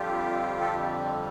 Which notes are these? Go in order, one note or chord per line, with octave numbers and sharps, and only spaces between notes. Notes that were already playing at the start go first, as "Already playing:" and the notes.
Already playing: F2 D3 G3 F4 G4
A4